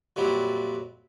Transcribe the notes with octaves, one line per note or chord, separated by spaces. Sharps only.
F2 A#2 F#3 G3 E4